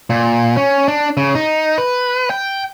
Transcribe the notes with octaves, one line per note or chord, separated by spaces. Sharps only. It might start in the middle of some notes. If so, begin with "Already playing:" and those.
A#2
C#4
D4
C#3
D#4
B4
G5